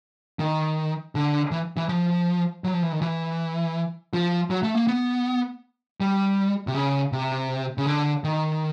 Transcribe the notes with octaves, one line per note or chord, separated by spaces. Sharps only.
D#3
D3
E3
E3
F3
F#3
F3
E3
D#3
E3
F3
F#3
A3
A#3
B3
G3
C3
C#3
C3
C#3
D3
D#3